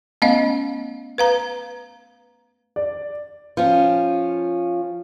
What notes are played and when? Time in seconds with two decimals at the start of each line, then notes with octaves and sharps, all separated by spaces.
0.22 A3 B3 C#4 D#5 F5
1.18 B4 F5 A#5
2.76 D5
3.57 F3 C#4